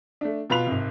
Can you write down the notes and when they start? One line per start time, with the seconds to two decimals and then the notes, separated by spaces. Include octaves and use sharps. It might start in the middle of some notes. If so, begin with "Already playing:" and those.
0.21 A3 D4
0.50 B2 F4 B4 B5 F#6 F7
0.66 G#1 C3